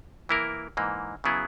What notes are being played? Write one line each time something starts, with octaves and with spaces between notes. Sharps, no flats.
E3 A#3 E4 A#4
G#2 E3 A#3
C#3 F#3 B3 E4 G#4